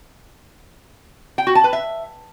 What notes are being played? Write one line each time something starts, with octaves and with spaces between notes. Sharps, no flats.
G5
F#4
A5
B4
E5